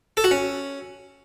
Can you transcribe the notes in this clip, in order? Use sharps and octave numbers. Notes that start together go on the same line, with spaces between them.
A4
F#4
C#4